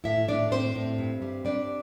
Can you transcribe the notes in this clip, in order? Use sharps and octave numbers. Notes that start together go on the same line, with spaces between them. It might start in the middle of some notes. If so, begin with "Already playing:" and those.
A2 E4 E5
A2 D4 D5
A2 C4 C5
A2
G2
G3
G3 D4 D5